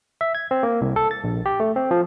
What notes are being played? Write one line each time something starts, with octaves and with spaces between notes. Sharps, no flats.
E5
G#6
C4
A#3
C2
A4
A6
A#1
G4
A3
C4
F3